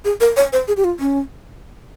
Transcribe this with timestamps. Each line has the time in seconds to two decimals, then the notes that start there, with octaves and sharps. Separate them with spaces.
0.05 G#4
0.20 A#4
0.37 C#5
0.53 C5
0.68 G#4
0.77 G4
0.84 F4
1.00 C#4